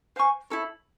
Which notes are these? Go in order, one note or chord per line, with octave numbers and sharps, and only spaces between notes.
C5 F5 G#5 C#6
E4 A4 C#5